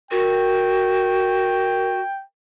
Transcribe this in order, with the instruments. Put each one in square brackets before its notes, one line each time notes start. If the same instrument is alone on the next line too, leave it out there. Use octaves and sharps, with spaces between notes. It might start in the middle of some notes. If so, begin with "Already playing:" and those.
[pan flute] F#4 [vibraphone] A#4 [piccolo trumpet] G5